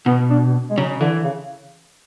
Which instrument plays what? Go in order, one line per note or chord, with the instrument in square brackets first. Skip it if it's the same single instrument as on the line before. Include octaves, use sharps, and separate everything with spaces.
[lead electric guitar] B2 [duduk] B3
[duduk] D4
G#3
[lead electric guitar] C#3 [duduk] F#3
[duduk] D3 [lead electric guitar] E3
[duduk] C#3